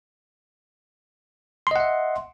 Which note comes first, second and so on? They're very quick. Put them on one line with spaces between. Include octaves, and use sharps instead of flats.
C6 D#5 F#5 E5